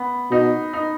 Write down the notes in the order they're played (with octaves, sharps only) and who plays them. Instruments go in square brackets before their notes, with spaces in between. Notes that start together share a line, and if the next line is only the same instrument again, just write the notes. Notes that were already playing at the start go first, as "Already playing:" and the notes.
Already playing: [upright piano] B3
[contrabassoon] B2 [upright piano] D#4
[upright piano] D#4